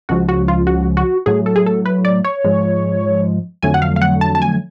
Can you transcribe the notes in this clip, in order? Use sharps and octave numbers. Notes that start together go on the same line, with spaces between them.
C#2 C#3 F3 G#3 F#4
F#4
F4
F#4
F#4
A2 F#3 A3 G#4
A4
G#4
A4
B4
D5
C#5
G#2 F3 G#3
F2 D3 F#3 A3 G#5
F#5
F5
F5
F#5
A5
A5
G#5